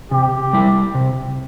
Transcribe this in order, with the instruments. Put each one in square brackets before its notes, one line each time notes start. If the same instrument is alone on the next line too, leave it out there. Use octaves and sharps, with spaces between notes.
[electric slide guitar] C3 [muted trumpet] G4
[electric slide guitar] G3 E4
C3